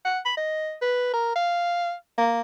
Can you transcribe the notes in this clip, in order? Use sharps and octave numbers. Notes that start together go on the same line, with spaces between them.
F#5
B5
D#5
B4
A#4
F5
A#3